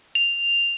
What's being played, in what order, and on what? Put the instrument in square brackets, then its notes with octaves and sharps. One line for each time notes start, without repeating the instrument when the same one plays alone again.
[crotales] F7